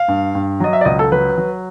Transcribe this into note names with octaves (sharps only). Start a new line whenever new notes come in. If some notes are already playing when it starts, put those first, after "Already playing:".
Already playing: F5
G2
G2
F#3 D#5
E5
D5
C#2 D#5
A4
F#3 B4
F#3